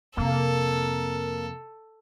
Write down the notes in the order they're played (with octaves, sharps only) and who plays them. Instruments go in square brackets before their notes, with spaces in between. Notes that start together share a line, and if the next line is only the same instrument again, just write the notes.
[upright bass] F2 C3 [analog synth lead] A#3 [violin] A4